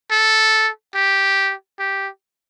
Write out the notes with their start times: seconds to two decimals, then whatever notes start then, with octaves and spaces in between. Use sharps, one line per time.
0.11 A4
0.95 G4
1.79 G4